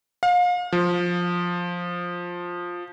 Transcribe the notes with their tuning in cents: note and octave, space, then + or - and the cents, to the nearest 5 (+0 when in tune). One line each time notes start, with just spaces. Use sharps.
F5 +35
F3 +10